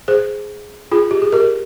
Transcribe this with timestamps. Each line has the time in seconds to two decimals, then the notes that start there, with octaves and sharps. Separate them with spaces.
0.08 G#4 C5
0.92 F4 G#4
1.11 G4
1.22 G#4
1.32 G4 A#4